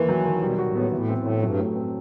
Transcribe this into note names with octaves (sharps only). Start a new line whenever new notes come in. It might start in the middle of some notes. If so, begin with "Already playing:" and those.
Already playing: D#2 D#3 E3
F#3
D#3
B2 G3
B2 F#4
A2
B3
A2 E3
C4
A2
A3
G2 F#3
A2
C4